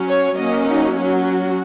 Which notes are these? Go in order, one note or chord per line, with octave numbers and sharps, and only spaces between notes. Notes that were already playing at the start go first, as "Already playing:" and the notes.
Already playing: F#3 C#4
C#5
F#3 A#3 C#4 D#5
D#4
F#3 C#4 F#4